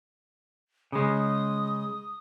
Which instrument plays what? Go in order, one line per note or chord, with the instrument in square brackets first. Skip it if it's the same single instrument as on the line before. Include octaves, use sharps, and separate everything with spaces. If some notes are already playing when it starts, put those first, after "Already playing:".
[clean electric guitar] C#3 G#3 [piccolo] D#6